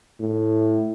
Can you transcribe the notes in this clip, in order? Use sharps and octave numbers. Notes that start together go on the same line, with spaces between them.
A2